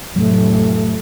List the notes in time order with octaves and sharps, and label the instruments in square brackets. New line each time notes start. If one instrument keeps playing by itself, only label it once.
[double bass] F1 [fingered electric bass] A2 F#3 [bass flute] A3